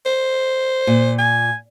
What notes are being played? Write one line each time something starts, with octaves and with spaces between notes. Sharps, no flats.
C5
A#2
G#5